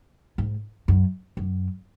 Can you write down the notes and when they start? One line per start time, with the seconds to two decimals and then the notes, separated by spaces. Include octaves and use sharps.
0.38 G#2
0.88 F#2
1.37 F#2